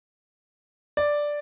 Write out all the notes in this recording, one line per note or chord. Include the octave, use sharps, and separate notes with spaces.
D5